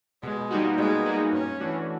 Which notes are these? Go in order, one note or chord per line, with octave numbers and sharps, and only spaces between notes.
B2 G#3
G3 A#3 D#4 F#4
B2 G#3
G3 A#3 D#4 F#4
G2 C#4
E3 A3 D4 F#4